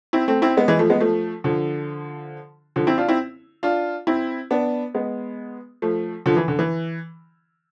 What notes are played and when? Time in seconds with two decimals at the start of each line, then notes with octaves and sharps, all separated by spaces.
0.13 C4 E4
0.28 A3 C4
0.42 C4 E4
0.57 G#3 B3
0.68 E3 G#3
0.79 F3 A3
0.90 G#3 B3
1.00 F3 A3
1.44 D3 F3
2.76 D3 F3
2.87 C4 E4
2.98 D4 F4
3.09 C4 E4
3.63 D4 F4
4.07 C4 E4
4.51 B3 D4
4.94 G#3 B3
5.82 F3 A3
6.26 D3 F3
6.37 E3
6.48 D3
6.59 E3